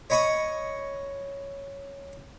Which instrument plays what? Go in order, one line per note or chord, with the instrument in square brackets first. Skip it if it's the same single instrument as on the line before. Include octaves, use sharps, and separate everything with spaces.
[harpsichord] C#5 D#5 B5 C#6 D#6